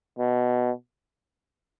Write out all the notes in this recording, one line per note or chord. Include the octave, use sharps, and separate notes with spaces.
B2